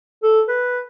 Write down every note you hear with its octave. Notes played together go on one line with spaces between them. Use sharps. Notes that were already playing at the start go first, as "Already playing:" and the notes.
A4
B4